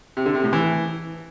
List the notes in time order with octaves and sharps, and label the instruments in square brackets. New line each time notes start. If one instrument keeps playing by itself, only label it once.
[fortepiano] C3
D3
C3
A2
E3